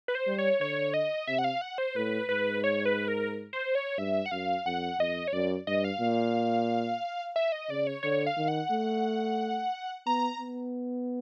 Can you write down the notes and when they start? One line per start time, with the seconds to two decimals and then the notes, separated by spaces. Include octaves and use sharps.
0.08 B4
0.15 C5
0.27 G3
0.38 C#5
0.60 D3 C#5
0.94 D#5
1.27 C3 E5
1.39 F#5
1.44 F5
1.61 F#5
1.78 C5
1.95 A2 B4
2.29 G#2 B4
2.64 C#5
2.86 B4
3.08 A#4
3.53 C5
3.75 C#5
3.98 G2 E5
4.26 F#5
4.31 F#2 F5
4.66 F2 F#5
4.99 F2 D#5
5.28 C#5
5.33 F#2 D5
5.67 G2 D#5
5.84 F5
6.00 A#2
7.36 E5
7.52 D#5
7.70 C#3 D5
7.87 C#5
8.03 D3 C#5
8.26 F5
8.37 D#3
8.48 F#5
8.71 A3
10.06 B3 A#5
10.40 B3